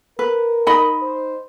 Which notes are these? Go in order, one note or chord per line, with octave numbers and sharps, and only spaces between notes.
A#4 B4
D#4 D#5 B5
C5